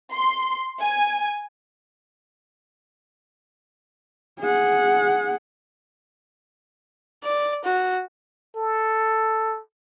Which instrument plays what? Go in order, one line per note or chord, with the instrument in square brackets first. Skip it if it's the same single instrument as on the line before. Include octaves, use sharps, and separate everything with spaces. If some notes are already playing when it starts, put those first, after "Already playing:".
[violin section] C6
G#5
[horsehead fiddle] G#4 F#5
[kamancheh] D5
F#4
[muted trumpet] A4